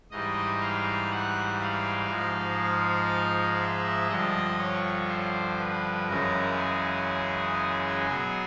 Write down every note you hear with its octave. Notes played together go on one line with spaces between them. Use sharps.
G#2 E3 G3 D#5
F5
F#5
F5
G#2 F3 G#3
F5
E5
G2 D3 F3 D#5
C#5
C5
B4
F#2 C#3 E3 G#3 A#4
G#4
B2 F#3 G#4